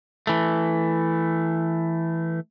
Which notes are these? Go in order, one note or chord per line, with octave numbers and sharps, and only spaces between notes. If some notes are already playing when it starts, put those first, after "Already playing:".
E3 A3